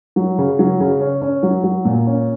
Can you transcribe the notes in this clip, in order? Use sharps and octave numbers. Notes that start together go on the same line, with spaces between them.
F#3
C#3
F#3
C#3
C#4
C#4
F#3
F#3
A#2
C#4